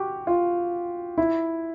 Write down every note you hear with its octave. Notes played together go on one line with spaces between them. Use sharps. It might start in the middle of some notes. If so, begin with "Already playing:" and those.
Already playing: F#4 G4
F4
E4